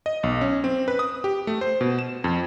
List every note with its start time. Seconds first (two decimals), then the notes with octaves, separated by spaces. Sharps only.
0.06 D#5
0.23 B1
0.41 C#4
0.64 C4
0.88 B4
0.99 D#6
1.24 G4
1.47 A3
1.61 C5
1.81 B2
1.99 E7
2.24 F2